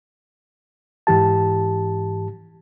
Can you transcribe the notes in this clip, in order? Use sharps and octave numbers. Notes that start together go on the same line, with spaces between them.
G#2 E3 G4 A5